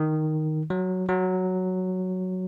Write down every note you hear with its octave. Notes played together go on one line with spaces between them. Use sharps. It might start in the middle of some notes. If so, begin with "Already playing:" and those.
Already playing: D#3
F#3
F#3